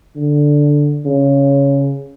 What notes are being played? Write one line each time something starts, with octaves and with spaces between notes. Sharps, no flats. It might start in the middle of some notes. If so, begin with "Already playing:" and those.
D3
C#3